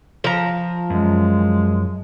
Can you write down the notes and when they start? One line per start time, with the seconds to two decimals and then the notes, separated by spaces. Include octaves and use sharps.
0.24 F3 A#5
0.90 F#2 G#3